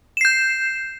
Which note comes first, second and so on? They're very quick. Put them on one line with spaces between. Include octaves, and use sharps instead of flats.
E7 C7 G6